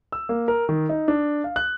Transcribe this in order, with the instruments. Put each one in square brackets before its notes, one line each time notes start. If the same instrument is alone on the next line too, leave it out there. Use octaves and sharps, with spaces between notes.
[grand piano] E6
A#3
A#4
D#3
D#4
D4
F5
F#6